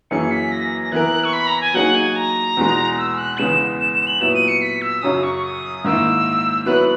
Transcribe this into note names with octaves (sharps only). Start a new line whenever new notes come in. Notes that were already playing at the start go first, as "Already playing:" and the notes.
F#2 E3 A#3 C#4 G#4 C#7
B6
A#6
E3 B3 E4 A#4 F#6
C#6
B5
A#5
G#5
F#3 A#3 D#4 G#4 F#5
G#5
A#5
E2 B2 G#3
E6
F#6
E2 C#3 G#3 B3 E7
E7
E7
F#7
A#2 F#3 B3 E4 E7
D#7
C#7
B6
E6
F#2 C#3 F#3 C#4 D#6
C#6
C#6
D#6
G#2 D#3 A#3 E4 E6
F#3 B3 E4 B4 F#6